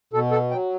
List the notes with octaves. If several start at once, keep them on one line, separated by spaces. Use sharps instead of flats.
B2 A4
A4
F#3 G5